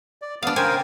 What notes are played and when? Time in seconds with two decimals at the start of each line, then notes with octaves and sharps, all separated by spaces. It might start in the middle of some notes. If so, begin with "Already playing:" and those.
0.22 D5
0.43 B3 D4 F5 D#6
0.56 C#3 A#4 C5 G5 G#5